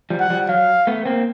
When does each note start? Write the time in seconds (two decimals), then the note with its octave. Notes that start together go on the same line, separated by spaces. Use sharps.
0.10 F3 G3
0.20 F#5
0.30 F3 G3
0.49 F#3 F5
0.87 A3 B3
1.06 A#3 C4